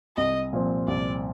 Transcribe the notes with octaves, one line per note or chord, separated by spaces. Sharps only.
C2 D#5
A#2 F3 C4
C2 D5